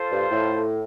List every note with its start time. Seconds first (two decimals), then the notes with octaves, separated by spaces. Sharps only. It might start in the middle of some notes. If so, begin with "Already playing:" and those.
Already playing: F4 A4 C5
0.11 G2
0.31 A2